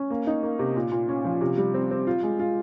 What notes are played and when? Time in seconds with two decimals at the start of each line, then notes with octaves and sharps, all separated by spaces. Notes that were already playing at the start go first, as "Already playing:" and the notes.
Already playing: C#4
0.10 A#3
0.27 D#4
0.43 A#3
0.59 C3
0.76 A#2
0.92 A#2
1.09 C#4
1.24 F3
1.41 C3
1.58 G3
1.74 C4
1.91 C4
2.07 F4
2.23 G#3
2.39 F4